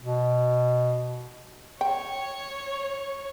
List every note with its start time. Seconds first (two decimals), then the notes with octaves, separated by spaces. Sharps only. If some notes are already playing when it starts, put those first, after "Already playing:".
0.02 B2
1.81 C#5 G5